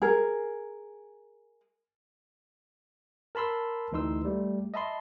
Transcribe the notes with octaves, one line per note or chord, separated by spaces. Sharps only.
G#4 A#4
A#4 A5 B5 C6 E6
D2 E3 D#4 C6 E6
G3 A3
D#5 E5 A5 B5 C6